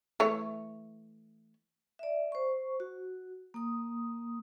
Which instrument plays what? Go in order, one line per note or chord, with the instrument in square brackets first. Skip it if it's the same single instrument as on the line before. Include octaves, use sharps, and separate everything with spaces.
[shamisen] E3 A3 C#5
[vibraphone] D5 E5
C5 C#6
F#4
A#3 D#6